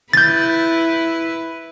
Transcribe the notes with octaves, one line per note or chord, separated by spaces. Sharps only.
E4 B4 G6 A6